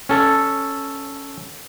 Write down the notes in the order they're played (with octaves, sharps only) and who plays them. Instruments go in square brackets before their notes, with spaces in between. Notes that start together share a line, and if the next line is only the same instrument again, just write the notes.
[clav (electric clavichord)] C#4 A4